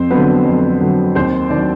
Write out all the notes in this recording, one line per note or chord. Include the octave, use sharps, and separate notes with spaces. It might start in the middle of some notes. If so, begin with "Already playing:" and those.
Already playing: F2 C4 C5
D3 F#3 B3 B4
F2
D3 F#3
D#2 C4 C5
D#3 F#3 D4 D5